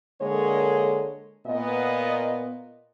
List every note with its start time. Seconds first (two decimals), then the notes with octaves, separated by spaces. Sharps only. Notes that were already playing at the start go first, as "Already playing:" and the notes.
0.22 D3 G#3 A#3 A4 A#4 C#5
1.47 A#2 B3 D#5